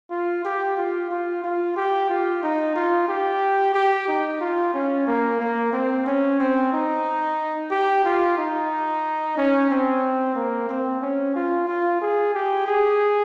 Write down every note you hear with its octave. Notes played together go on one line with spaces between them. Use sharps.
F4
G4
F4
F4
F4
G4
F4
D#4
F4
G4
G4
D#4
F4
C#4
A#3
A#3
C4
C#4
C4
D#4
G4
F4
D#4
C#4
C4
A#3
C4
C#4
F4
F4
G#4
G4
G#4